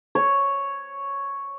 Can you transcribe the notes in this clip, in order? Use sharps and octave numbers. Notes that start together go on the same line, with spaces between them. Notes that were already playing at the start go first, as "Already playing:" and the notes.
C#5